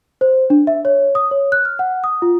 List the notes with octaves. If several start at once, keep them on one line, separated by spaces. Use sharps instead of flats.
C5
D4
E5
C#5
D#6
C#5
F#6
F6
F#5
D#6
F4